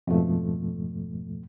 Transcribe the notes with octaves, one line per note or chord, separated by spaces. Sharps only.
F2 G#2 B2 F3 A3